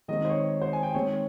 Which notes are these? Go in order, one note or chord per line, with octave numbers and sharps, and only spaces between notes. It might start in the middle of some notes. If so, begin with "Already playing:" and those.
D#3 G#3 C4 D#5
C5
C#5
C5
G#5
G5
D#3 G#3 C4 C#5